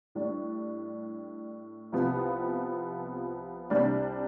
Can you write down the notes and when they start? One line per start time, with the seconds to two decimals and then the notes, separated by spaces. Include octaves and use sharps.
0.15 A2 G3 D4
1.92 C2 C3 F3 B3
3.70 C2 C3 G3 D4